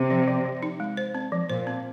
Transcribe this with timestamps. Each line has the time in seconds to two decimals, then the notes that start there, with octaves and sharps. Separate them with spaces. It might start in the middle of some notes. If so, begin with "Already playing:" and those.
Already playing: C3
0.10 F3
0.28 F3
0.45 F3
0.63 D#4
0.80 G#3
0.97 C5
1.15 C4
1.32 F3
1.49 A#2 C5
1.67 C4